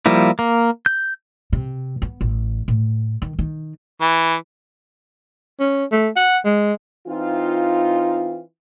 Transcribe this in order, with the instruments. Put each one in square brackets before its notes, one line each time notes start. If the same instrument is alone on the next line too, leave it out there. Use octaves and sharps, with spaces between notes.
[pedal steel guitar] F3 G3 A#3 E4
A#3
G6
[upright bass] C3
B3
A1
A2
D#3
D#3
[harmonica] E3
[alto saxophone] C#4
A3
F#5
G#3
[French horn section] E3 C4 D#4 F4